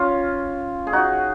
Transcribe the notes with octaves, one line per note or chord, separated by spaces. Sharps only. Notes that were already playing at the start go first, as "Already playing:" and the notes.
Already playing: C#4 F4
G#4
D#4 F#4